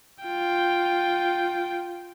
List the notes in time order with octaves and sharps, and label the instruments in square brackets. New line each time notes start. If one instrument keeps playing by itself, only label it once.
[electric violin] F4 G5